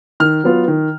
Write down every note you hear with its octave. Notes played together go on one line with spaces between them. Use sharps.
D#3 F6
F#3 B3 F4
D#3